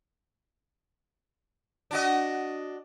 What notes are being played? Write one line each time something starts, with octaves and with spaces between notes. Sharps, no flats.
D4 F#4 D#5